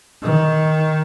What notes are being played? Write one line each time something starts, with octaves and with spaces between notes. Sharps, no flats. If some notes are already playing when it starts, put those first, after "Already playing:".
D#3